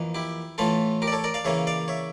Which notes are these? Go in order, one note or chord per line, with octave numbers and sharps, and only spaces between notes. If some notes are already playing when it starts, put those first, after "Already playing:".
Already playing: F2 E3 A#3
E4 G4
A2 E3 A3 F4 A4
G4 A#4
D5
A4 C#5
A#4 D5
D5 F5
C#3 E3 A#3 C#5 E5
D5 F5
C#5 E5